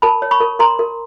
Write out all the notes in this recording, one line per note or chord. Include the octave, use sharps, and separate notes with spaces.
A#4 A5 B5
C#5
B5 C#6
A#4
A#4 A#5 C6
A#4